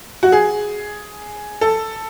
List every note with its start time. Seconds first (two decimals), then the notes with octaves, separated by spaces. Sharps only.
0.23 F#4
0.32 G#4
1.61 A4